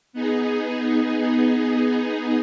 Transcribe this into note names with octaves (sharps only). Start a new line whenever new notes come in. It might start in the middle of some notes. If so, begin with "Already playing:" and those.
B3 D#4 G#4